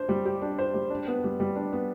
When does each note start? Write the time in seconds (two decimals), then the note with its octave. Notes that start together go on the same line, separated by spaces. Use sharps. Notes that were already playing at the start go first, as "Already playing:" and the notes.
Already playing: D4 C5
0.09 G3
0.25 G4
0.42 D4
0.58 C5
0.74 G3
0.90 D4
1.08 B3
1.24 G3
1.40 G3
1.56 D4
1.73 B3